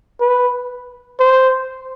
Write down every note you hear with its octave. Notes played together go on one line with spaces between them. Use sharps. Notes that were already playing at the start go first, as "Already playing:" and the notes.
B4
C5